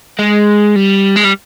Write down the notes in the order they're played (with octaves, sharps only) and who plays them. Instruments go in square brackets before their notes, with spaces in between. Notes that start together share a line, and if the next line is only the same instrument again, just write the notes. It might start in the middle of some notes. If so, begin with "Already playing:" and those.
[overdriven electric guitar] G#3
G3
G#3
G3